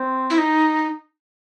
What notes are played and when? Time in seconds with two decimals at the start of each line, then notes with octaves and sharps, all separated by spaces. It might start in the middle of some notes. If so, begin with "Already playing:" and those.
Already playing: C4
0.30 E4
0.38 D#4